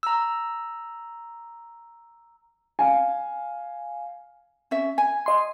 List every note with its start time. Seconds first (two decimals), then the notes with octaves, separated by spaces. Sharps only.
0.03 A#5 E6
2.79 F5 G#5
4.71 C#4 E5
4.98 G#5
5.26 D#5 C6